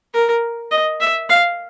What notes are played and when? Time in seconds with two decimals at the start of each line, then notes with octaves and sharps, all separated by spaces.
0.14 A#4
0.71 D#5
1.00 E5
1.29 F5